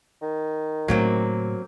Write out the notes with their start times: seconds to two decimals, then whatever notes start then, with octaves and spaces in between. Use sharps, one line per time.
0.22 D#3
0.88 A2 C#3 F#3 A#3 C4